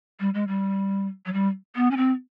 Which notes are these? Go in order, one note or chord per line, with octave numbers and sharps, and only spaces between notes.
G3
G#3
G3
F#3
G3
B3
C#4
C4